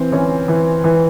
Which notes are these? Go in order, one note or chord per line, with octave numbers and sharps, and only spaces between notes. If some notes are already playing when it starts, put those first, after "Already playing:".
Already playing: E3 C4
E3 C#4
E3
E3